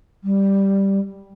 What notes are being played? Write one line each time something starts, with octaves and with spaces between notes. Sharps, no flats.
G3